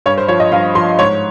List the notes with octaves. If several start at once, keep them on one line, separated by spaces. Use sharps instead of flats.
G2 C#5
C5
F3 C#5
D#5
G2 F5
F3 C6
G#2 C#5